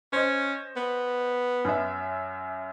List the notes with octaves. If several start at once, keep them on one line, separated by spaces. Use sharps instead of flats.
C#4 C5 D#5
B3
F#2 E5